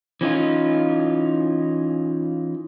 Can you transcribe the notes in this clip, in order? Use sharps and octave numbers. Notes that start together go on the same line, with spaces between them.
E3 C#4 D#4 F4